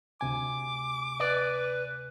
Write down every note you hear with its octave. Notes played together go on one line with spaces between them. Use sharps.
D2 C3 G#5 D6
B4 D5